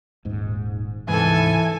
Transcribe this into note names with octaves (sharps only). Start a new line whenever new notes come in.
D#1 G#2
D2 G#2 C3 E3 A4 G#5